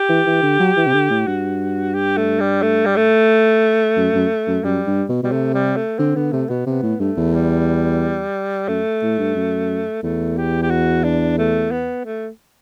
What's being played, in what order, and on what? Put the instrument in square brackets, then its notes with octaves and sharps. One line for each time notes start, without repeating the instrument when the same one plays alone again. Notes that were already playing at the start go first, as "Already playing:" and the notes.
Already playing: [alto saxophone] G4
[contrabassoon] E3
E3
D3
F#3
E3
C3
D3
A2
[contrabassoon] G2 [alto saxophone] F#4
[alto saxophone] G4
A3
G3
A3
G3
A3
[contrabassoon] F#2
F#2
F#2
[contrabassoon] F#2 [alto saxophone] G3
[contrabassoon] G2
B2
[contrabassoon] B2 [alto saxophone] G3
[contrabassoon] C3 [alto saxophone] A3
[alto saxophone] G3
A3
[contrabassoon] D3 [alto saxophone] C4
[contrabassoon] D3 [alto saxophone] B3
[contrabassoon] C3 [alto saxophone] A3
[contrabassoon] B2 [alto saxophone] B3
[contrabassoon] C3 [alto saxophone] B3
[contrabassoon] A2
[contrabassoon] G2 [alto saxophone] A3
[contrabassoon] E2
[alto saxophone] G3
[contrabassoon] F#2 [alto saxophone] A3
[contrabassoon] A2
G2
F#2
[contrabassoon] E2 [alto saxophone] A3
[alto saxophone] G4
G4
F#4
D4
A3
B3
A3